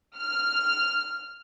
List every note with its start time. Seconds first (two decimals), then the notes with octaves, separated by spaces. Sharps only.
0.18 F6